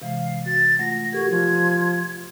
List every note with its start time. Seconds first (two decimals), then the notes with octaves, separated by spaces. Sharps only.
0.02 C3 E3 G#3 F5
0.46 F#4 A6
0.79 A3 F4 F#5 A#6
1.13 F#4 G4 A4 A#4 G#6
1.30 F3